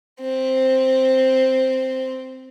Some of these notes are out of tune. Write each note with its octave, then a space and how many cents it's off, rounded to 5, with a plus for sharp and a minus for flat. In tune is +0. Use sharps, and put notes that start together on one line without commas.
C4 +0